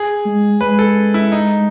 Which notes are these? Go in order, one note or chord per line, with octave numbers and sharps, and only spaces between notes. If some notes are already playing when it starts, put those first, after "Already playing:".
Already playing: G#4
G#3
G#3 B4
A4
E4
D#4